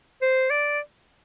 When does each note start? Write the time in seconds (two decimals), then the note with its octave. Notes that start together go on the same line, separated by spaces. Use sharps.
0.22 C5
0.50 D5